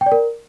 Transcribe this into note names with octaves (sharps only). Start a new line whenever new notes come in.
G5
D5
A#4